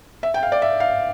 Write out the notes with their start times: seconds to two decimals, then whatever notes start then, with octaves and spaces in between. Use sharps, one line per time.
0.23 E5
0.34 G5
0.43 F5
0.52 D5
0.62 E5
0.80 F5